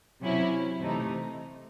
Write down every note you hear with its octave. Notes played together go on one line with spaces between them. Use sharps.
C3 F#3 C#4 E4
C3 E3 A3 D#4